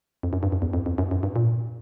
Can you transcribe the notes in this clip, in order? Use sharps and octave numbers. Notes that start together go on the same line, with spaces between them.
F2
F#2
G2
F#2
E2
F2
F2
F#2
F#2
G2
A#2